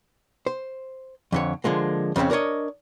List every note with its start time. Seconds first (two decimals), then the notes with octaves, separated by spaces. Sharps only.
0.46 C5
1.32 F2 D3 C#5
1.64 D3 F3 G#3 A#3
2.16 F2 C#3 A#3 C4 C#4
2.30 D4 A#4 B4 C#5 D#5